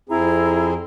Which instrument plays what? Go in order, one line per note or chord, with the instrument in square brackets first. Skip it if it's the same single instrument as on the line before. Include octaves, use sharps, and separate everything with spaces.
[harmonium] F2 C4 G#4 [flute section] E4 A#5 B5